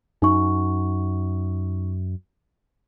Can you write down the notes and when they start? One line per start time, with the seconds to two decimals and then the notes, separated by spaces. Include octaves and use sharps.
0.22 F#2 D#4 C#6